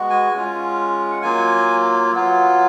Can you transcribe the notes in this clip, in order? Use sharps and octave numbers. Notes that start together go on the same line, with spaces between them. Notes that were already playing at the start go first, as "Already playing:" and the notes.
Already playing: G#3 B3 F#4
G#5
G#3 C#4 F4
F#5
F#3 A#3 F4 G#5
F#3 B3 F4